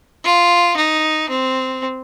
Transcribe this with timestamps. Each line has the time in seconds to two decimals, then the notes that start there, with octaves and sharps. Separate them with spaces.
0.24 F4
0.76 D#4
1.29 C4